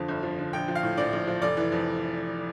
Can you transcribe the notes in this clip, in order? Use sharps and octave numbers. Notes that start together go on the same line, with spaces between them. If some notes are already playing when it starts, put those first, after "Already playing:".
Already playing: F2 D3 F3 A5
G1
F3
D3
A#1 G5
F3
F5
A2
A#1 D5
A#1
F3
F1 D5
E3
F2